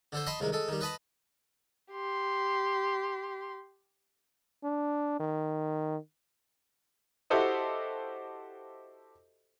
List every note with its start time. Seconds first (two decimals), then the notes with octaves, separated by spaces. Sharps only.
0.12 D3 A4 C5
0.27 D#5 A5 B5 C6
0.40 C2 D#3 G#3
0.52 G#3 A4
0.68 D#3 G3
0.81 B4 D#5 A5 B5
1.92 G4 C6
4.64 D4
5.20 D#3
7.30 E4 F#4 G4 A4 C5 D#5